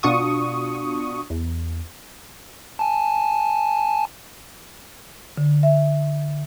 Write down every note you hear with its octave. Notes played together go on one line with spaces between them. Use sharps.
B2 D4 F4 F#4 C#6 D#6
E2
G#5 A5
D3
E5